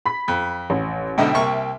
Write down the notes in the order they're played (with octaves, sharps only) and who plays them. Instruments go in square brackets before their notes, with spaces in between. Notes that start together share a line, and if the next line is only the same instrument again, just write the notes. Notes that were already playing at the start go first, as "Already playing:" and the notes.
[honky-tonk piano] B5 B6
[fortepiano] F2
[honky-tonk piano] A1
[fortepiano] G#2 B2 D3 [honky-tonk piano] E5 G5
[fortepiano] C2 A#3 C#6